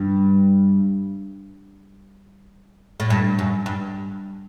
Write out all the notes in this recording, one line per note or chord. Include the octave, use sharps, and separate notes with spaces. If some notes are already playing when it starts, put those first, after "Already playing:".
Already playing: G2
A2
G2
F#2
G2